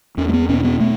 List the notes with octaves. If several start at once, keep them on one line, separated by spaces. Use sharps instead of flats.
E2 C#4
A3
B3
B2 C#4
B3
A3